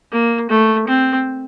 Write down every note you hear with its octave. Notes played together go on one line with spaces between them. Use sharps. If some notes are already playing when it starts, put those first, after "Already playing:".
A#3
A3
C4